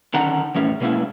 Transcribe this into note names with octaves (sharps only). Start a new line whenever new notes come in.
D3 D#3 C#4 D#4 F#5 A#5
E2 A2 C#4
B2 G#3 A#3 C#4 E4